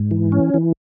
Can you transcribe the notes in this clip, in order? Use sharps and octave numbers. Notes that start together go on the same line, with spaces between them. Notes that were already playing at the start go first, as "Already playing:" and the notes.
Already playing: G#2
E3
C#4
E3